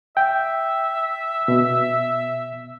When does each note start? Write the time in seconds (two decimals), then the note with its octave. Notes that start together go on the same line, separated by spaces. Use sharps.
0.17 E5 G5
1.48 B2